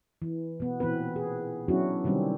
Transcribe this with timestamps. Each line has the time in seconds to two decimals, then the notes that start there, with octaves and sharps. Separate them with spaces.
0.22 E3
0.60 B2 B3
0.80 A#2 E3 B3 C4 B4
1.16 G#4
1.68 F#3 B3 C#4 D4 E4 F#4
2.04 C3 D#3 G3 C4 C#4